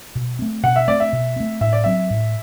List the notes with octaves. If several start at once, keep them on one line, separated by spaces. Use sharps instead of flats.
B2
A3 C4
B2 F#5
E5
A3 C4 D5
E5
B2
A3 C4
A2 E5
D5
F#3 C4 E5
A2